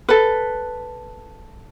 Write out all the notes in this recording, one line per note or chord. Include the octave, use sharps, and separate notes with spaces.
A4 B4